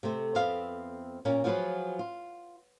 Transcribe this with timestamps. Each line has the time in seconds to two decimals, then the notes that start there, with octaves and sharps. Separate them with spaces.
0.03 C3 A3 C4
0.35 F2 B3 C4 C5 E5 F5
1.25 A#2 A#3 C#4
1.44 F3 F#3 F4 F#4 G#4 B4
1.99 F4